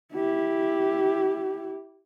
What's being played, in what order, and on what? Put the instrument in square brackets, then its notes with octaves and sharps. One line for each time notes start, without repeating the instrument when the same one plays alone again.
[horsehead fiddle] E4 G4